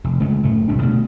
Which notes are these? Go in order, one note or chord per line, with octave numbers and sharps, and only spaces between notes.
F1
C#3 G#3 A3
F#1 A2 A3
D#1 C2 F#2 D4
B2 A3